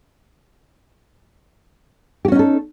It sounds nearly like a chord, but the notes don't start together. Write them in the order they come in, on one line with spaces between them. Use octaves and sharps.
G4 F#4 C#4 D#4 A4